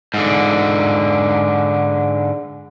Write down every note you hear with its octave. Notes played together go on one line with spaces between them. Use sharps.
G#2 D3